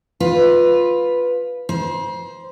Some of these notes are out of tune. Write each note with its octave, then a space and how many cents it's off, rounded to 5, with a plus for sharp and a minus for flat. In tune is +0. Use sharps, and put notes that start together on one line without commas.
F4 +10 B4 +0
C5 +0 A#5 +45